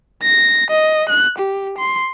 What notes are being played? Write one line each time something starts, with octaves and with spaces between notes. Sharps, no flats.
A#6
D#5
F#6
G4
C6